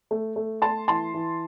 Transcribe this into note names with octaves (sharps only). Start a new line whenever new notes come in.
A3
A3
A3 A5 C6
E3 A5 C6
E3